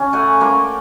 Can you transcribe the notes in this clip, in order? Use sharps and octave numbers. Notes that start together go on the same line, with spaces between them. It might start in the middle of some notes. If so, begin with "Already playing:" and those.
Already playing: C#3 C#4
A3 F#5 G#5
A#3 C6 D6